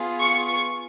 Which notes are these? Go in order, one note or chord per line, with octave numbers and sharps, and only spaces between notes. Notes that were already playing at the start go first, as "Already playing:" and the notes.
Already playing: B3 F4 G#4
C#6
C#6